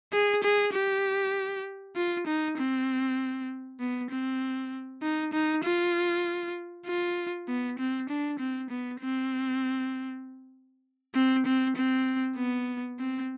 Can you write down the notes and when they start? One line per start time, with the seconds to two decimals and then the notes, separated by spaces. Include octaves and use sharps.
0.13 G#4
0.44 G#4
0.73 G4
1.96 F4
2.27 D#4
2.58 C4
3.80 B3
4.11 C4
5.02 D#4
5.33 D#4
5.64 F4
6.86 F4
7.48 B3
7.79 C4
8.09 D4
8.39 C4
8.70 B3
9.00 C4
11.15 C4
11.46 C4
11.76 C4
12.37 B3
12.99 C4